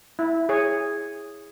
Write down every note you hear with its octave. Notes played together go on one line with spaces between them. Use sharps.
E4
G#4 C#5